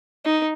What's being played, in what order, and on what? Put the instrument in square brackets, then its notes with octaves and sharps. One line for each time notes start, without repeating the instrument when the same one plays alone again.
[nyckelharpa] D#4